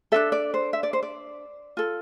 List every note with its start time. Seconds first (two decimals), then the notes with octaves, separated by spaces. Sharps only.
0.12 D4 F4 A4 E5
0.32 D5
0.54 C5
0.73 E5
0.83 D5
0.93 C5
1.03 D5
1.77 F4 A4